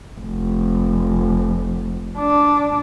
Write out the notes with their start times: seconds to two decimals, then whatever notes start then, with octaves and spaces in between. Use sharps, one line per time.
0.20 F1
2.18 D4